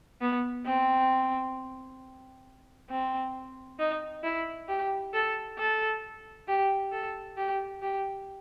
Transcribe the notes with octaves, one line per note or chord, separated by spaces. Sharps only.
B3
C4
C4
D#4
E4
G4
A4
A4
G4
A4
G4
G4